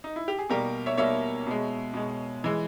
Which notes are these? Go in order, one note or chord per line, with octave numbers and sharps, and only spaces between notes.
D#4
E4
G4
G#4
B2 G3 A#3 G4 A#4
C#5 E5
B2 G3 A#3 C#5 E5
B2 G#3
B2 G#3
E3 G#3